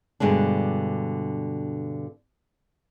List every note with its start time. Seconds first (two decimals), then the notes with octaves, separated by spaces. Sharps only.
0.20 G2 B2 D3 G#3 D4